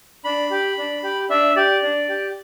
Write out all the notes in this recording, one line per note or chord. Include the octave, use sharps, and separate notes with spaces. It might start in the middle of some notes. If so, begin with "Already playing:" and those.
D4 B5
G4
D4
G4
D4 E5
G4 D5
D4
G4